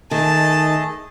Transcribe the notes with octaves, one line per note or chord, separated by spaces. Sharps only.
D#3 A3 G#4 D#5 A5